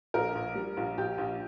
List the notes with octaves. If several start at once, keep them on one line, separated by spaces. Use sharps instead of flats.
A#1 A#4
A#1
G3
A#1
A#1 G4
A#1